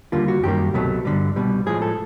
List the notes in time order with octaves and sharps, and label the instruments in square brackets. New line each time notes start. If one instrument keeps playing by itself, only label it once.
[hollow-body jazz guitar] D#2 D3 G3 A#3 F4
F#4
F#2 D#3 G3 A#3 G4
C2 B2 F#3 A3
G2 D3 G3
C2 B2 G3
A2 F3 G#3 G#4
A4